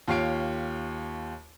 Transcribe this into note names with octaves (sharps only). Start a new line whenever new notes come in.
D#2 F4 G4 C#5 C7 D7